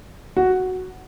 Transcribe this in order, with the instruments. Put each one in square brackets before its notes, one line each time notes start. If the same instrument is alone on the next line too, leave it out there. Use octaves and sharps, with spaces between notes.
[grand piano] F#4